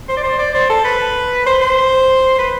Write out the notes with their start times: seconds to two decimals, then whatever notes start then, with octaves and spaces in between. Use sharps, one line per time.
0.09 C5
0.17 D5
0.24 C5
0.39 D5
0.54 C5
0.70 A4
0.85 B4
1.46 C5
1.61 C5
2.39 B4